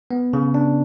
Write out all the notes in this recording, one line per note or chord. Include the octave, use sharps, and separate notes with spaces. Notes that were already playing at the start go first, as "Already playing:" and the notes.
B3
C#3
D4